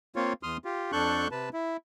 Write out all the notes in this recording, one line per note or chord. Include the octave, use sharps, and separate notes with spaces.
A#3 C4 F4 C#5
E2 C6 D#6 F6
F4 G4
F2 D4 A4 C#6 F#6 G6
C3 B4 A5
E4